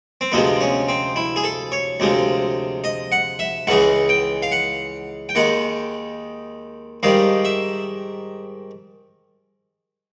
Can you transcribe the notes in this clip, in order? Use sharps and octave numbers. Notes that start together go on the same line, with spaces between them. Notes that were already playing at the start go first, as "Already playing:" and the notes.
C4
D2 C3 F3 G#3 B3
C#4
C4
E4
G#4
A4
C#5
D2 C3 F3 G#3
D#5
F#5
E5
C#2 C#3 E3 G#3 F#5
G5
F5
F#5
G5
D#2 D#3 G#3 F#5
G#2 D#3 G3 F5
E5